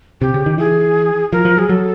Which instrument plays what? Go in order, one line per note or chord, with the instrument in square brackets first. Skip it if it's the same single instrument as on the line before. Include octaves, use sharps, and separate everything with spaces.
[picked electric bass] C3 [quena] G4
[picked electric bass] C#3
D#3
[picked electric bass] E3 [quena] G#4
[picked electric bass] F3 [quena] A#4
[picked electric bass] F3
[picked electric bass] F#3 [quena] G#4
[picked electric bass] F#3 [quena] A4